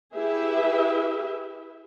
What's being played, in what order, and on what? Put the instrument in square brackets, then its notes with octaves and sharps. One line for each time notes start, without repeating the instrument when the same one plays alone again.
[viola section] E4 G4 G#4 B4 E5